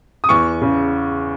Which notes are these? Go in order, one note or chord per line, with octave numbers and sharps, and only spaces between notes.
D#6
E2 C#6
C#3